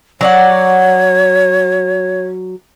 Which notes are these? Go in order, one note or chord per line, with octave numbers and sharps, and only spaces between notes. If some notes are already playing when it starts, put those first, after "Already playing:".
F#3 C#5 D5 F#5